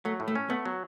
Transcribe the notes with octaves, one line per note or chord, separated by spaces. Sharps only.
F#3 A3
A2
A3
C#4
A3 B3
F#3